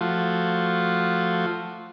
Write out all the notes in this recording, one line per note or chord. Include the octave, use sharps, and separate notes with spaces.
F3 A3 F4 F#4